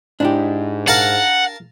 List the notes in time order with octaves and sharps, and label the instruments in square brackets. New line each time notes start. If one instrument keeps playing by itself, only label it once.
[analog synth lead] G#2 [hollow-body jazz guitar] D4 E4 G4
[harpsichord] A#4 F5 A5 [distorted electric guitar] F#5